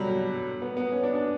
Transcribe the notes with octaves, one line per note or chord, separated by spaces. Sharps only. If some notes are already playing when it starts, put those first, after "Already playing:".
Already playing: B2 D3 F#3 G3
B3
B3
C#4
D4
D4